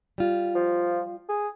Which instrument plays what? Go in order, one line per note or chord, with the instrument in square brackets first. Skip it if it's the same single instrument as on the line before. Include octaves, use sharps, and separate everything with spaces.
[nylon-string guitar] G3 F4
[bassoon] F3
G#4